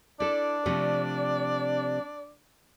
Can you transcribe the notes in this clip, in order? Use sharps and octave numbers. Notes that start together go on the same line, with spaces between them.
D4 E4 A4 D5
C3 F3 A3